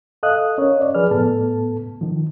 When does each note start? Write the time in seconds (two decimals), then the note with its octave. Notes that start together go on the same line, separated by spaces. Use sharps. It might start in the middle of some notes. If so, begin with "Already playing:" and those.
0.23 A4 D#5 F5 D#6 F#6
0.58 C#4 A#4 C#5 D#5
0.81 D5
0.95 F3 G#4 B4 D5 F6
1.11 A2 B3 A4 A5
2.01 D#3 F3